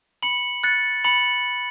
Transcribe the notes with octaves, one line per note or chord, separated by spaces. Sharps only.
B5 C#7 F#7
F#6 A6 C#7
B5 C#7 F#7